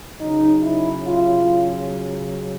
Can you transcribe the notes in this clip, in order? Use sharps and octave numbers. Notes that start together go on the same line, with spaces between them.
C#3 F#3 D#4
E4
F4